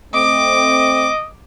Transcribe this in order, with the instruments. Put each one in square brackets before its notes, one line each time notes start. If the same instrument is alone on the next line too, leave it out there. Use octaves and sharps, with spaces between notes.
[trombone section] A3 C4 [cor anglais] D#5 [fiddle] D6